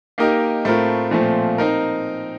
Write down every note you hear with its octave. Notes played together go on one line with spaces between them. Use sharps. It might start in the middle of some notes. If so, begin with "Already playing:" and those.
A#3 D#4 G4 A#4 D#5
A2 A3 C4 F4 A#4
A#2 F3 A3 C4
C4 D#4 A#4